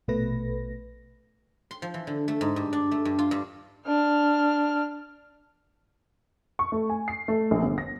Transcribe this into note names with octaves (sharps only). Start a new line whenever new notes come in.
A#1 B2 A3 B4 A#6
C6
F3
E3
D3
A3
G#2
G2
D4
A3
G2
F4
G2
D4 F6
C#6
A3
G#5
C7
A3
A#1
G1
A#6